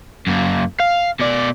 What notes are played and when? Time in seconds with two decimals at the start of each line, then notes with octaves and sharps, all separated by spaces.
0.27 F#2 A#3
0.80 F5
1.19 B2 D5